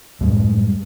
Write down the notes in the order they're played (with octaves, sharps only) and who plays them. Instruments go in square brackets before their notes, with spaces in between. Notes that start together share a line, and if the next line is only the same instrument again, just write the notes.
[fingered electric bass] F#2 A2 G3 G#3